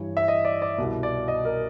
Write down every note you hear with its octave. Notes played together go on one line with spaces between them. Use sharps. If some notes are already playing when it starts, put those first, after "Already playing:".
Already playing: G2 E3 C#5
E5
D#5
D5
D5
C2 B2
D5
D#5
A#4